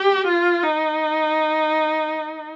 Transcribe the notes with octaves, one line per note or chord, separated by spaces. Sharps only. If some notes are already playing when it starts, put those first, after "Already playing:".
Already playing: G4
F4
D#4